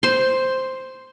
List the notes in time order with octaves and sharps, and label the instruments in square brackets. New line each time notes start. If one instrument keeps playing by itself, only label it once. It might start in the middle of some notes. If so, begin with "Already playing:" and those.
[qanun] C5 C6